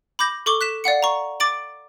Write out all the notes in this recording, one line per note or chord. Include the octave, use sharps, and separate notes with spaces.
B5 D6 G6 A#6
A4 C#6 D6 G7
F#6 B6 E7
D5 F5 F#5 C#7
A#5 C#6
D6 A6 D7 F#7